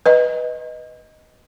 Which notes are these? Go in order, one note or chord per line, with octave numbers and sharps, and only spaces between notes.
B4 D#5